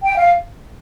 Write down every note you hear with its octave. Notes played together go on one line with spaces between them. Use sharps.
G5
F5